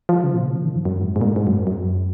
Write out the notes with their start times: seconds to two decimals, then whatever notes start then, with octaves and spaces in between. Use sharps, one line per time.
0.09 F3
0.24 C#3
0.34 A#2
0.45 C#3
0.55 F3
0.65 D#3
0.75 F#2
0.85 F#2
1.01 G#2
1.16 G#2
1.21 A#2
1.26 G#2
1.36 G#2
1.47 F#2
1.67 F#2